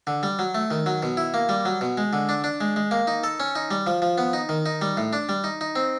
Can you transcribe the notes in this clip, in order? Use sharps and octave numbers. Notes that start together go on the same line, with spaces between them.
D3
G3
F#3
A3
D#3
F#3
B2
E4
A#3
G3
F#3
B2
G#3
D3
D4
D4
G#3
G#3
A#3
D#4
A4
C#4
D#4
G3
F3
F3
B3
D#4
D#3
D#4
G3
A2
D4
G3
D#4
D#4
C4